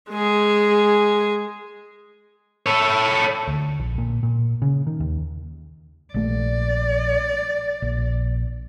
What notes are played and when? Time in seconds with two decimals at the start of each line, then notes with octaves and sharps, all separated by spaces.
0.11 G#3 G#4
2.66 A4 C#5
3.48 D2
3.80 A#1
3.98 A#2
4.23 A#2
4.62 C#3
4.87 D#3
5.00 D#2
6.14 A#1 A3 D5
7.82 A#1